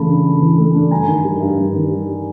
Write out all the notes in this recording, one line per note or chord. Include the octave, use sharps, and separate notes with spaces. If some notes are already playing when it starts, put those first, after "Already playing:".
Already playing: C#3 E3 A3 A5 B5
D4
C#3
E3
A3
D4
G2 G#5 A#5
D#3
G3
G2
G2
D#3
G3